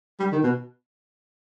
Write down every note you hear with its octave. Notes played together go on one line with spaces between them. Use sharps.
G3
D#3
B2